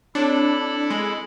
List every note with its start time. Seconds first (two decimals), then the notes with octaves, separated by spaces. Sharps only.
0.15 C4 D4 E4 A4 C#5 B5
0.90 G#3